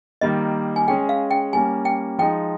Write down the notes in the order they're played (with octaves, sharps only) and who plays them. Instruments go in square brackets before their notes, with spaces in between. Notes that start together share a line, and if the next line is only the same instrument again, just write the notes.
[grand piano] D#3 G3 A#3 [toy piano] D#5
[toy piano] G#5
[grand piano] G#3 C#4 G#4 [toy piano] G5
[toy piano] F5
G5
[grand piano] G3 A#3 C#4 [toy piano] G#5
[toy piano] G5
[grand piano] F3 G#3 D#4 [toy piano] G5